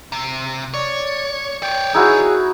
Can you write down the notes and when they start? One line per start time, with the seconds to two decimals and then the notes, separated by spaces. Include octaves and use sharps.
0.12 C3
0.74 C#5 D5
1.62 C#5 D5 G5
1.94 D#4 E4 F#4 G#4